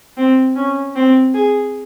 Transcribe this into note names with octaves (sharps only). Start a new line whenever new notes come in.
C4
C#4
C4
G#4